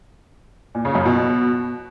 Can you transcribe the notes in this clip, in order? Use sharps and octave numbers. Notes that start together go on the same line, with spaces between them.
A#2
C#3
F#2
B2